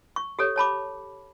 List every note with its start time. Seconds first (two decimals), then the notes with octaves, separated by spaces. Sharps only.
0.16 C#6
0.39 G4 A4 C#5
0.56 C#5 A5 B5 D6